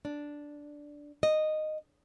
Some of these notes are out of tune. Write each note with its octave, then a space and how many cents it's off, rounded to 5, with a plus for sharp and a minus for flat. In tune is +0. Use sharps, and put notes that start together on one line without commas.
D4 -5
D#5 -10